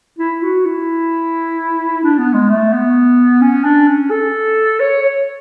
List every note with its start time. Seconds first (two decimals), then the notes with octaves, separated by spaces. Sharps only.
0.19 E4
0.43 F#4
0.65 E4
2.04 D4
2.18 B3
2.34 G#3
2.49 A3
2.73 B3
3.42 C#4
3.64 D4
3.88 C#4
4.11 A4
4.80 C#5
5.02 C#5